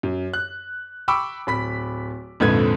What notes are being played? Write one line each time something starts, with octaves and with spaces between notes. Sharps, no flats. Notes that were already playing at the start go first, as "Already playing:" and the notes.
F#2
F#6
G5 B5 C#6 D6 E6
D1 B5 B6
A#1 F2 G#2 D3 B4 G#6